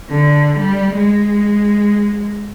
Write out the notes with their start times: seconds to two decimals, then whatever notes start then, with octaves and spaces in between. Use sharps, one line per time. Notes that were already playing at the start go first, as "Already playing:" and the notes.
0.10 D3
0.59 G3
0.97 G#3